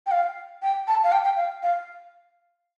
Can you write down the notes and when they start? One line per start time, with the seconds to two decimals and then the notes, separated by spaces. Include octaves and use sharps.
0.06 G5
0.11 F5
0.62 G5
0.88 A5
1.04 F5
1.12 G5
1.24 G5
1.37 F5
1.63 F5